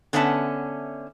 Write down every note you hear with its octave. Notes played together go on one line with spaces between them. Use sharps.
D3 B3 C#4 E5 F#5 A5